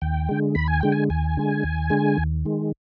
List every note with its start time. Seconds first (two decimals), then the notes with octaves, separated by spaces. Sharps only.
0.02 D#2 G5
0.29 D3 G#3
0.55 D#2 B5
0.68 G#5
0.81 D3 G#3 G5
0.92 G#5
1.10 D#2 G#5
1.37 D3 G#3
1.63 D#2
1.90 D3 G#3
2.18 D#2
2.45 D#3 G#3